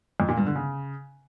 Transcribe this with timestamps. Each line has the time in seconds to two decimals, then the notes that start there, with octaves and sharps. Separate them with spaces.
0.20 F2
0.29 A#2
0.38 G2
0.46 D3
0.55 C#3